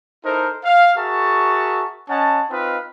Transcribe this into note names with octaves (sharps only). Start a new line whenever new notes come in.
D#4 E4 A4 A#4 C5
F5
F#4 G#4 A#4 E5 A5 C#6
C#4 D#5 F#5 A5
C4 D#4 F4 B4 D#5 F5